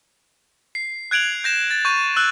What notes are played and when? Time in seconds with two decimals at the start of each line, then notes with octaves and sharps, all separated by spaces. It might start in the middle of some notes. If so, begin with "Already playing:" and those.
0.75 C7
1.11 F#6 G#6 D7 F7 F#7
1.44 G6 A#6 E7
1.71 A6
1.85 C#6 G6 D#7
2.16 E6 F#6 F#7